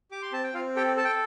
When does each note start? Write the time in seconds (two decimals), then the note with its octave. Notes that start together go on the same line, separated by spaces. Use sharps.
0.11 G4 D6
0.22 C6
0.32 C4 A5
0.44 G5
0.54 C4 F4 F5
0.76 G4 A4 G5
0.97 A4 A5
1.04 G5